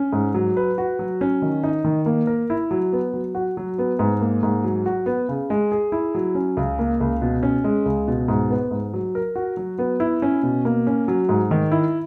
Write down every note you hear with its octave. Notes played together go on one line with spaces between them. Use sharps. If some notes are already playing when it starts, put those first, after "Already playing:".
Already playing: C#4
G#2
F#3
B4
F#4
F#3
C#4
D#3
D#4
D#3
A#3
A#4
E4
F#3
B3
F#3
F#4
F#3
B3
G#2
A#3
G#2
F#3
F#4
B3
C#3
G#3
G#4
E4
F#3
C#4
C#2
A#3
C#2
B2
C#4
G#3
C#2
B2
G#2
B3
G#2
F#3
A#4
F#4
F#3
B3
E4
C#4
B2
A#3
C#4
F#3
G#2
D#3
E4